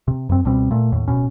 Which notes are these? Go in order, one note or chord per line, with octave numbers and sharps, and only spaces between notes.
C3
F#2 C4
C#2 B2 G3 C4
A#2 A3
D#2 A2
D1 B2 C#4